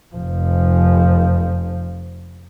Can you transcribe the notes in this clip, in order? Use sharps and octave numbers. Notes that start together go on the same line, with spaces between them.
F1 F3